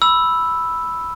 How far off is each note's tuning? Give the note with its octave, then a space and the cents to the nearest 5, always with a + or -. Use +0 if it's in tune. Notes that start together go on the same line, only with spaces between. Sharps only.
B5 +0 E6 +0